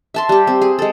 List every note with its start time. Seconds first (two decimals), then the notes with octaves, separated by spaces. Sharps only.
0.14 E5 A5 C6
0.29 G3 G4
0.47 C4
0.62 G#4
0.79 G#3 A4